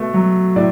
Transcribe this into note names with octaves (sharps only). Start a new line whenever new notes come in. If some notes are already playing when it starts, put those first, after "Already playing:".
Already playing: B2 A3
F#3
A2 D5